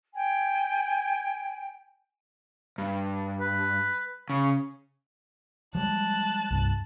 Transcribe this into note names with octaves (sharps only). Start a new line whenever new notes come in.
G5 G#5
G2
B4
C#3 C#6
F3 G3 G#3 A5 F#6
C2 G2